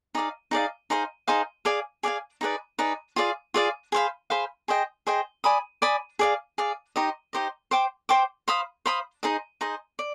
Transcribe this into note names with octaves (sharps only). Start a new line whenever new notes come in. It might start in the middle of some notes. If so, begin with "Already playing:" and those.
D#4 G#4 D5 F5
D#4 G#4 D5 F5
D#4 G#4 C5 F5
D#4 G#4 C5 F5
G#4 D5 F5 G#5
G#4 D5 F5 G#5
D#4 G#4 B4 D5
D#4 G#4 B4 D5
F4 G#4 D5 F5
F4 G#4 D5 F5
G#4 C5 F5 B5
G#4 C5 F5 B5
G#4 C5 D#5 G5
G#4 C5 D#5 G5
D5 G#5 B5 D#6
D5 G#5 B5 D#6
G#4 D5 F5
G#4 D5 F5
D#4 G4 C5 D#5
D#4 G4 C5 D#5
C5 G5 D6
C5 G5 D6
C5 F5 B5 D#6
C5 F5 B5 D#6
D#4 G#4 C5 D#5
D#4 G#4 C5 D#5
D5